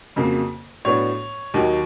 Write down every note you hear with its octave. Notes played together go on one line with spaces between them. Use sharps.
F2 C#3 F#3 A#3
A2 F#3 B3 D4 C#5 C#6
D#2 D#3 F#3